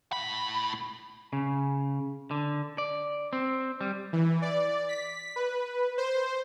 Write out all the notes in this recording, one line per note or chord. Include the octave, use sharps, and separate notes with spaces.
A2 B5
C#3
D3
D5
C4
G3
E3
D5
B6
B4
C5